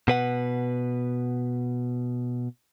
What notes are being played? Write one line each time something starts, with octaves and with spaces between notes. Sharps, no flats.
B2 B4 F#5